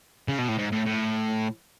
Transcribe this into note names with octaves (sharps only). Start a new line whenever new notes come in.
C#3
B2
A2
G#2
A2
A2